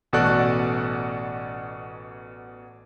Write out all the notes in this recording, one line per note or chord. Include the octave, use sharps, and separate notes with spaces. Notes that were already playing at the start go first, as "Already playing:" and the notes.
A1 B2 F#4 A4 D5 F#6